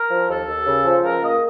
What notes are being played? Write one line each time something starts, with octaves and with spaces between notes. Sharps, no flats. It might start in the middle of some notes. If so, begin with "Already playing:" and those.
Already playing: A#4
F3
D#2 A4
D#2
C#3
F3
C#2 A#4
A#3 D#5